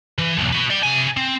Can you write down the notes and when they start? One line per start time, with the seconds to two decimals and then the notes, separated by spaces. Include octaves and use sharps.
0.18 E3
0.38 B1 E2
0.52 F#4 B4
0.70 D5 G5
0.83 C3 G#5
1.17 C4